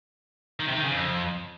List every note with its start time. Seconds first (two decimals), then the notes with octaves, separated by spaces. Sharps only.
0.59 D#3
0.67 C3
0.75 D#3
0.83 C#3
0.91 F2